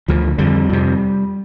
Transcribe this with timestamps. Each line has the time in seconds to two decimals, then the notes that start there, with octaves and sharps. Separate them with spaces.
0.08 D2 D3 F3
0.38 F2 D3 G3
0.69 F2 C3